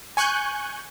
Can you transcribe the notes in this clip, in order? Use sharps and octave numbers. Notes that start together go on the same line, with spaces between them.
G#5 C#6 F#6 G6